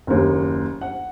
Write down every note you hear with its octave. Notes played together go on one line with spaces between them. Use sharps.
F#1 D#2
F#5